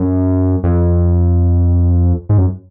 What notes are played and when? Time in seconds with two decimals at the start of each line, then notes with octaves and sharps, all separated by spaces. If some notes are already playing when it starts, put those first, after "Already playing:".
Already playing: F#2
0.64 F2
2.29 G#2
2.38 F#2